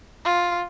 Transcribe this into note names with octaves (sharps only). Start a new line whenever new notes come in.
F4